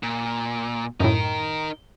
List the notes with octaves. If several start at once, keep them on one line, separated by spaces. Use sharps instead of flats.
A#2
F#2 A2 D#4 A#4